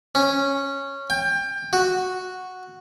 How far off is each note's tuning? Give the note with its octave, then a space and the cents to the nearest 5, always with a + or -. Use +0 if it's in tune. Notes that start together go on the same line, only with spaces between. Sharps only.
C#4 -5
G5 +25
F#4 -5